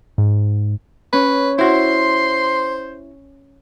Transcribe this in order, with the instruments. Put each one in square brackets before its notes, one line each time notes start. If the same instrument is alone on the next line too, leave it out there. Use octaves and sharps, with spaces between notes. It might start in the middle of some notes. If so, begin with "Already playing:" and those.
[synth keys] G#2
[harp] C#4 [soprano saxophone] B4
[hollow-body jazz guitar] E4 F#4 [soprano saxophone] C5 [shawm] C6